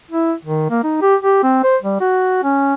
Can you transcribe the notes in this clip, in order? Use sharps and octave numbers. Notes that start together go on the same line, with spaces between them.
E4
D#3
A#3
D#4
G4
G4
C4
C5
G3
F#4
C#4